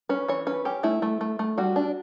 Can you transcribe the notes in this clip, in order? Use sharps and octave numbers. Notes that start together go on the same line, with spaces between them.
C#4 B4
E3 C#5
C#4 B4
C#4 G4
A3 E4
A3
A3
A3
G3 F#4
D4